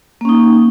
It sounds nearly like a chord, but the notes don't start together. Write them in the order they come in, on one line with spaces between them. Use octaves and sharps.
A#3 C#4 D#4